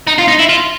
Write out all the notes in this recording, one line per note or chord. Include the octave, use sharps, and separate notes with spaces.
D#4
F4
D#4
E4
F4